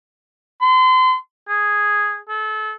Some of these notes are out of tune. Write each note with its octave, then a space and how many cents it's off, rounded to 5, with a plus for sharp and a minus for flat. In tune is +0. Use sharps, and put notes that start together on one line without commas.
C6 -35
G#4 -5
A4 -30